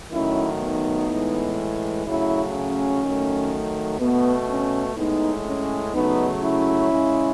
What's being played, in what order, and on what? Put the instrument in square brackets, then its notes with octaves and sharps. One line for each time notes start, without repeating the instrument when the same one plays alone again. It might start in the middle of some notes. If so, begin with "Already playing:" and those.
[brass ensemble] D#3 F#3 A3 C#4 E4
B3 D#4
A2 E3 G#3
C#3 F#3 A3 C#4 E4
C#4
D#3 F#3 A3
B2 A3 B3
C#4
A2 G#3 B3 D#4
C#4
C#3 F#3 A3 B3 D#4
C#4 E4
C#3 G#3